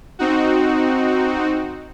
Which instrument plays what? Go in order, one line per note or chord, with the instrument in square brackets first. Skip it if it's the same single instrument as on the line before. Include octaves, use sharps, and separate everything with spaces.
[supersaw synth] C4 D#4 F#4